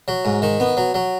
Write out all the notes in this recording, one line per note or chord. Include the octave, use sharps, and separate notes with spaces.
F#3
G#2
D#3
B3
F#3
F#3